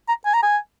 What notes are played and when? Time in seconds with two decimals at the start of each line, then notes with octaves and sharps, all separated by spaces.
0.08 A#5
0.25 G#5
0.34 A#5
0.43 G#5